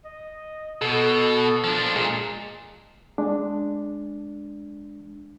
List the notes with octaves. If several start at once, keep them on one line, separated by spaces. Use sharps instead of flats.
D#5
B2 A4
F3 D4
A#2 G#3
G#3 D4